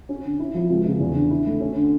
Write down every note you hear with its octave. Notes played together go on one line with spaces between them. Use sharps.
C#4
D3
E4
F3
C#2
C#3
E2
D3
E4
A3
C#4
D3